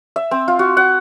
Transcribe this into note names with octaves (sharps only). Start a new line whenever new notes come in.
E5
C4
F4
F#4
F#5